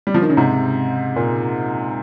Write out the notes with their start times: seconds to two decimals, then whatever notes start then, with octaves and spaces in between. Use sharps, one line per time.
0.07 G3
0.14 F3
0.22 D#3
0.30 C#3
0.37 G#2 C3
1.16 A#2